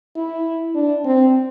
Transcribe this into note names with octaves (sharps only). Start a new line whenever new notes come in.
E4
D4
C4